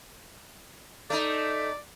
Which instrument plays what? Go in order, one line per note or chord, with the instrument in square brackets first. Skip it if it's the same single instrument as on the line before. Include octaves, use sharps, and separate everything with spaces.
[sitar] A3 D#4 [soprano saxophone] D5